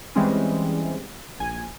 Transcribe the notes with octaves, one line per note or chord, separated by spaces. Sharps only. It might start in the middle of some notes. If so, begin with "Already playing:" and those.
E3 G3 G#3 C4 C#4
A#1 G#5